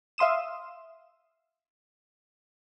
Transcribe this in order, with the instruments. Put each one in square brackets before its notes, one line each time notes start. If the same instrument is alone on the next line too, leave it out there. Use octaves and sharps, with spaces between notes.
[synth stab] E5 F5 C6 D#6 E7